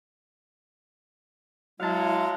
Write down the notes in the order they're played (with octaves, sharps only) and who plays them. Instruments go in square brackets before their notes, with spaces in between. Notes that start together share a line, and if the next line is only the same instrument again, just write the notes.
[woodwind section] F#3 G#3 [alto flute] E4 [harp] F5 A5